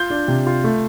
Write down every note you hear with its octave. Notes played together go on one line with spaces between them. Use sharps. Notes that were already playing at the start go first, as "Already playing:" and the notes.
Already playing: F4 G6
D4
C3
F4
A3